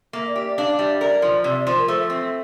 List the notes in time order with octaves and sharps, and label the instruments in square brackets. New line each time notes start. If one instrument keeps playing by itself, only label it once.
[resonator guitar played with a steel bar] A#3 [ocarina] E5
[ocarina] D5
[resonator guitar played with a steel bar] G4 [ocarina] E5
[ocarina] D5
[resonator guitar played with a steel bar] D4 [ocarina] F5
[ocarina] F5
[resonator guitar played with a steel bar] G3 [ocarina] E5
[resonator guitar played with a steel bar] A#4 [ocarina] D5
[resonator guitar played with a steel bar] F3
C3
[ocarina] E5
D5
[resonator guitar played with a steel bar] F3 [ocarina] C5
[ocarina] A#4
[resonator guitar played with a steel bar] A3 [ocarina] C5
[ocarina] E5
[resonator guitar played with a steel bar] C4